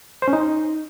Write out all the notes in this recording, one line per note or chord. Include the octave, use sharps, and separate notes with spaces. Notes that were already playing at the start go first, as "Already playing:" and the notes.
C5
C#4
D#4